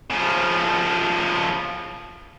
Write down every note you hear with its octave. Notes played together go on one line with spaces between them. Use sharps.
C#3 F3